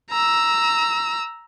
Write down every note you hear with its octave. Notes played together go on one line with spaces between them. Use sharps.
A#5 E6